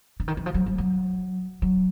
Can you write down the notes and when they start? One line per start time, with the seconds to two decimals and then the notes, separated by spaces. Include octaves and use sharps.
0.20 D3
0.28 D#3
0.37 E3
0.46 F3
0.54 F#3
0.66 G3
0.78 F#3
1.62 F#3